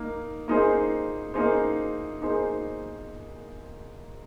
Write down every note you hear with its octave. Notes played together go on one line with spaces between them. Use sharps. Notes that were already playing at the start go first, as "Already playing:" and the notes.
Already playing: A#3 D#4
A#3 D#4 G#4 C5
A#3 D#4 G#4 C5
A#3 D#4 G#4 C5